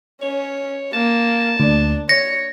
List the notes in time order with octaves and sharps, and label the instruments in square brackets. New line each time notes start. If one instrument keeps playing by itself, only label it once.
[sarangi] C#4 [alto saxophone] C#5
[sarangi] A#3 [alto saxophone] A5
[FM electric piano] D2 [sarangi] D4
[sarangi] C#5 [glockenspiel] A#6 [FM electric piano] C#7